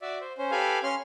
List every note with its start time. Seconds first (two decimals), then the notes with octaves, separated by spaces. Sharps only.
0.02 F#4 D5 E5
0.21 C5
0.38 C#4 C5
0.51 G4 A4 B4 F5 G#5
0.83 C#4 C6 F6